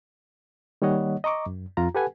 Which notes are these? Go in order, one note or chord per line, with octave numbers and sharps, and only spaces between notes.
D#3 G3 A#3 C#5 D#5 F#5
D#5 A#5 C#6 D6
F#2
F2 F4 A#5
G4 A4 B4 F#5 G#5